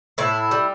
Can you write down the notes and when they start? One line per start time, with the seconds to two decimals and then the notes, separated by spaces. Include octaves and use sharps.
0.18 A2 E4
0.51 G3